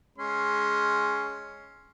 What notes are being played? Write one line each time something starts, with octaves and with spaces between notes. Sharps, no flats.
G#3 C#4 C6